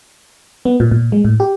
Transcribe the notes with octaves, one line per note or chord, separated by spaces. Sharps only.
B3
A#2
A#2
G#3
A2
G4